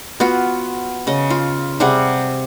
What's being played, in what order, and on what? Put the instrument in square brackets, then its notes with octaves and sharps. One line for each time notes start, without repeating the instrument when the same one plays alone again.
[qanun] B3 F4 F#4
C#3 D#5
F4
C3 G3 G#4 F#5